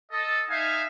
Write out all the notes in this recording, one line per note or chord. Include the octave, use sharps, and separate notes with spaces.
A4 D#5
D#4 E5 F5 G#5